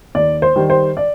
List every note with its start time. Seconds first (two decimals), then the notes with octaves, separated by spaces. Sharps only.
0.15 D#2 D5
0.42 C5
0.56 D#3 G3
0.70 C5
0.97 D5